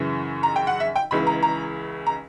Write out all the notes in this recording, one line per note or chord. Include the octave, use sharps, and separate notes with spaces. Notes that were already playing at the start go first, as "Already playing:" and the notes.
Already playing: F#2 C#3 E3
A#5
G5
F#5
E5
G5
C#2 C#3 E3 B5
A#5
A#5
A#5